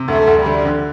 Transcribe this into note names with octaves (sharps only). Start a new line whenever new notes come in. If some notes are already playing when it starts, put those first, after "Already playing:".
Already playing: C3
D2 A3
D2
G3
D3
D3